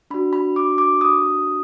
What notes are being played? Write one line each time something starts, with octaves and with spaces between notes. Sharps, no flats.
D4 F#4 B5
B5
D6
D6
D#6